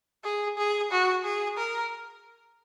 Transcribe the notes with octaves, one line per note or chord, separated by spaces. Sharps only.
G#4
G#4
F#4
G#4
A#4